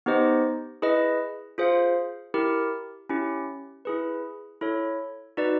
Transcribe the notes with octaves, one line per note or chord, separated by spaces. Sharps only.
B3 D#4 G4 C5 D#5
E4 G#4 B4 D#5
F4 G#4 C5 F5
E4 G4 A#4
C#4 E4 G4
E4 G#4 B4
E4 A4 C#5
D#4 F#4 B4 D5